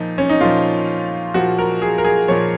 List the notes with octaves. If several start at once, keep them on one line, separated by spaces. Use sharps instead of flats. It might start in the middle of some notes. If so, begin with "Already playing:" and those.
Already playing: A#2 F3 D#4
C#4
D#4
A#2 F3 F4
A#2 F3 F#4
A#4
G#4
A#4
G#4
A#2 F3 C#5